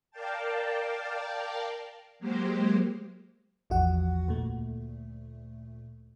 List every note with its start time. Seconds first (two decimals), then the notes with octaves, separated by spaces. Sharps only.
0.11 A#4 D5 F5 G5 A5
2.19 F#3 G#3 A#3 G4 C5
3.70 A1 E2 F3 F#4 F#5
4.28 D2 A#2 A3